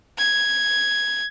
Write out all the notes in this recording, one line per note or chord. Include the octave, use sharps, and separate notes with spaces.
G#6